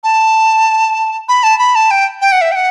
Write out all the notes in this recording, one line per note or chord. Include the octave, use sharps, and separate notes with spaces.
A5
B5
A5
B5
A5
G5
G5
F#5
E5
G5
F#5